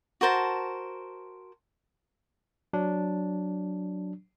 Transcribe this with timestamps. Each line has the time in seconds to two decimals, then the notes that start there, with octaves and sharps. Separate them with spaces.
0.21 F#4 A#4 C5 A5
2.73 F#3 D4